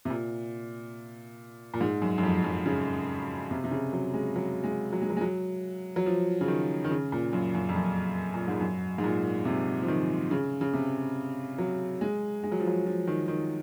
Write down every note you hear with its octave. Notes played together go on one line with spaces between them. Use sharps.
C3
A#2
A#2
G#2
F#2
F#2
F2
F#2
C#3
C3
C3
C#3
F#3
G#3
F#3
G#3
F#3
G#3
F#3
G#3
F#3
F#3
F3
C#3
D#3
D#3
C#3
A#2
F#2
F#2
F2
F#2
A#2
G#2
F#2
G#2
A#2
C3
F3
D#3
C#3
C#3
C3
F#3
G#3
G#3
F#3
F3
F#3
F3
D#3
D#3